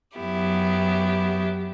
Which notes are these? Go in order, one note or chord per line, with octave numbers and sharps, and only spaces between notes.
F#2 F#3 B3 E4 G4